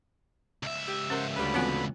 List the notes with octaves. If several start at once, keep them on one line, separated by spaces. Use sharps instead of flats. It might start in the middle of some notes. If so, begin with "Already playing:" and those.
C#2 E5
G4
C#4 A#4 C5 F#5 A#5
D2 D3 G3 B4 B5
E3 B3 C4 F4 F#4 G#5